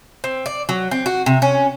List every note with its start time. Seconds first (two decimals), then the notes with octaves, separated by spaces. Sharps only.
0.24 C4
0.46 D5
0.69 F#3
0.91 C4
1.06 F#4
1.26 C3
1.42 C#4